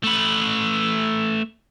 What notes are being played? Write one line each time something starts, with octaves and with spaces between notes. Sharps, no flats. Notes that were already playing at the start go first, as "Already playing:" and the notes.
A3 B4